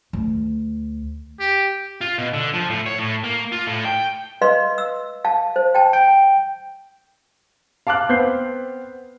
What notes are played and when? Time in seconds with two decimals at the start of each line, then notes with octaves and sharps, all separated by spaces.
0.13 D2
1.40 G4
2.01 F4
2.18 B2
2.34 D3
2.54 F3
2.70 A2
2.86 C#5
2.99 A2
3.24 A#3
3.52 F4
3.67 A2
3.85 G5
4.42 B4 D#5 F5 C6
4.78 E6
5.25 F5 A5
5.56 C5
5.75 G5 A5
5.93 G5
7.87 F5 A5 D6 F6 F#6
8.09 B3 C4 G6 C7